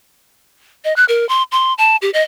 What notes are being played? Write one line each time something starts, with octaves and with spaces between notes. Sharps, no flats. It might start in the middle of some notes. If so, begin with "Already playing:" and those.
D#5
F#6
A#4
C6
C6
A5
G4
D#5